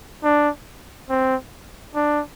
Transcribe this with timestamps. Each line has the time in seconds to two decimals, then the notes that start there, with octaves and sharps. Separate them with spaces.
0.23 D4
1.09 C4
1.95 D4